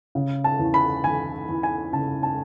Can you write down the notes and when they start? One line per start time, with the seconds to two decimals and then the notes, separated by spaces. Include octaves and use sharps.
0.15 C#3
0.44 A5
0.59 E2
0.74 B5
1.04 E3 G#5
1.49 E2
1.63 G#5
1.93 C#3 A5
2.23 A5